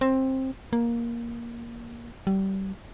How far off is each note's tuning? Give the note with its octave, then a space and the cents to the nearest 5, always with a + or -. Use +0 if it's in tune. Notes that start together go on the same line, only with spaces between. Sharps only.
C4 +15
A#3 +10
G3 -25